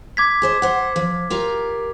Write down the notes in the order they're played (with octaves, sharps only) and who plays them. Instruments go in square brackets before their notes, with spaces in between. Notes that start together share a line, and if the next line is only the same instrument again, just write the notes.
[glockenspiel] D6 G#6 B6
[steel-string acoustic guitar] G#4 C5 D#5
C5 F#5
F3
F4 G4 A#4